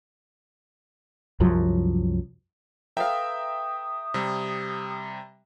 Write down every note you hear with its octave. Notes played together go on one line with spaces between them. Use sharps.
C2 F#2 F3 F#3
A4 B4 E5 F5 G5 A#5 D#6
C3 G3